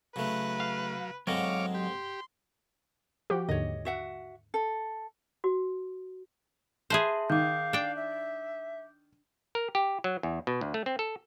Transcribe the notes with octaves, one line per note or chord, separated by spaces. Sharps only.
C#3 F#3 A3 B4
F5
G#2 D3 F#3 C4 C#5 D#5 F5 D6
G4 C6
F3 F#4 G4
D#2 G#2 D3 C#5 D#5
F#4 E5 F#5
A4
F#4
G#4 B4 C5 E5 A5 C6
D#3 F5 D6 G6
D4 G5
E5
A#4
G4
F#3
E2
B2
D2
A3
C4
A4